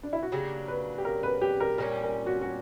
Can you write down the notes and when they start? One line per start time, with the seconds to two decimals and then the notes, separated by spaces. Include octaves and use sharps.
0.03 D4
0.13 E4
0.22 F#4
0.32 C#3 F#3 A#3 D4 G4
0.68 B4
0.98 G4
1.05 A#4
1.23 B4
1.42 G4
1.60 A#4
1.78 A#2 G3 C#4 A#4
2.03 A#4
2.26 F#4
2.41 F#4